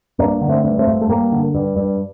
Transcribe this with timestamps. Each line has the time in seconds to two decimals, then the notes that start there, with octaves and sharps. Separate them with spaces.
0.19 G2 A#3 D4
0.41 D3
0.49 A3 C4
0.64 G2
0.79 A3 C4
0.87 G2
1.01 A3
1.09 G2 G3 A#3
1.32 D3
1.54 G2
1.77 G2